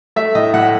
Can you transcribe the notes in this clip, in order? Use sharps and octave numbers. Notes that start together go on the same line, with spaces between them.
A3 E5
A2 D#5
A2 F#5